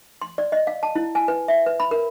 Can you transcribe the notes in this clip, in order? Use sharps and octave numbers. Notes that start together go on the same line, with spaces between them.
C6
D5
D#5
F5
A5
E4
G#5
B4
E5
B4
B5
A#4